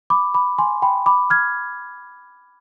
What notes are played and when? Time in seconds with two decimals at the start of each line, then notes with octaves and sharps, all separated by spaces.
0.10 B5 D6
0.34 B5 D6
0.59 G#5 C6
0.82 G5 B5
1.06 B5 D6
1.30 F6 G#6